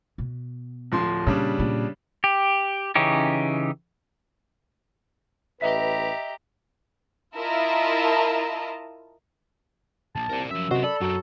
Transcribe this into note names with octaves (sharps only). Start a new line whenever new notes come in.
B2
D1 F3 C6
A#2 C#3 G3 D4
A#2
G4
C#3 E3 C#4 D#4 G4
A1 G4 B4 D#5 E5 A#5 B6
E4 F4 A#4 D#5 A5 A#5
F3 A#3 A5
C2 A#4 D5
F#2 F3 E5 E6
C3 B3 F#4 C5 D#5
A4 D5 B5
F#2 F#3 D4 D#4